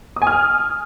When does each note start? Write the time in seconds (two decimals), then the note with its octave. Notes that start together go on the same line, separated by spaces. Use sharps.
0.16 D#6
0.22 G#5
0.27 F6